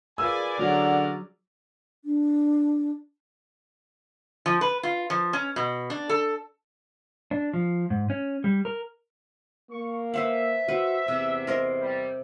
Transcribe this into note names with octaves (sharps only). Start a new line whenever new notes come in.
F4 G#4 A#4 B4 D5 G#5 E6
D3 F#3 C#4 A#4 F#5
D4
F3
B4
F4
F3
C#4
B2
D4
A4
D4
F3
G#2
C#4
G3
A#4
A#3 C#6
B4 C5 E5 F#5
F#4 B4 C5 F#5
E2 C3
A#4 C5 D#5
G3